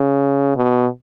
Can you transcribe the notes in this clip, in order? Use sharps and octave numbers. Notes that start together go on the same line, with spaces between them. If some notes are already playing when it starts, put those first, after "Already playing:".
Already playing: C#3
B2